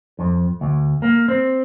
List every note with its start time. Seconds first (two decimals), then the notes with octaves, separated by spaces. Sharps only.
0.19 F2
0.61 D2
1.02 A#3
1.28 C4